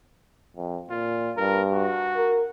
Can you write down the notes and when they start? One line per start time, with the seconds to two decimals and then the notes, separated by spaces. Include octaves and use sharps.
0.56 F2
0.90 A#2 F4
1.37 G2 A#4
1.72 F#4
2.17 A#4